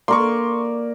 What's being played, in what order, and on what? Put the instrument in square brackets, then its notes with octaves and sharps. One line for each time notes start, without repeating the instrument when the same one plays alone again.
[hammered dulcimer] A#3 A#4 [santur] D5 [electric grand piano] C6 C#6